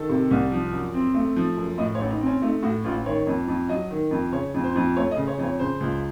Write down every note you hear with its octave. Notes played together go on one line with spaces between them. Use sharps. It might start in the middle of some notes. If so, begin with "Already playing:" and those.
Already playing: D#3 A4
C3
C2
F3
F#2
C4
A3
F3
F#2
A2 D#5
C#5
A1
D#4
C4
C#4
A3 D#4
A2 F#4
A1 F4
D#3 C#5
F2
F2
F#3 D#5
D#3
F2
C#3 C#5
F2
C5
F2
A3 C#5
D#5
C#3
C#5
F2
C#5
C#3 C5
C#2